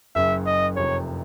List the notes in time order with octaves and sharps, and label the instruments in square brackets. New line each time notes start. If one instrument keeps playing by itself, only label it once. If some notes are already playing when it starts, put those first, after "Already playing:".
[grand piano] F#1 F#2 C#3 [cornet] E5
[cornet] D#5
[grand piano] F1 F2 C3 F3 [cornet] C#5